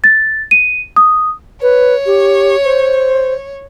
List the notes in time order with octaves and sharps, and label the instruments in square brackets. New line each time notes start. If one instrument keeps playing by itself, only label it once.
[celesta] A6
D#7
D#6
[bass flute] B4 [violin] C#5
[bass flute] G4
C5